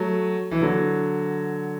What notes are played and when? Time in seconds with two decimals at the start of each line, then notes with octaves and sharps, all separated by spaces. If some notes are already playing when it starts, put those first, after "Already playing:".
Already playing: F#3 A3
0.51 E3
0.61 D3 F#3